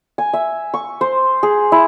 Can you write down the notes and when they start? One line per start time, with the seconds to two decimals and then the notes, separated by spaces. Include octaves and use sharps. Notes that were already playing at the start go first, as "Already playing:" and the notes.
0.18 G#5
0.33 E5
0.74 C#6
1.01 C5
1.43 G#4
1.72 E4